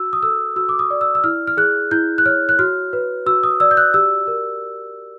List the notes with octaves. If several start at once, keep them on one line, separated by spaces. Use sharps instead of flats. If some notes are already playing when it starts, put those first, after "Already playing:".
Already playing: F#4 E6
D#6
A4 E6
F#4 E6
D6
D#6
D5
E6
E6
E4 F6
F6
G#4 F#6
E4 G6
F#6
C#5 F6
F#6
F#4 F6
B4
F#4 E6
D#6
D5 E6
G6
F#6
G4 E6
A#4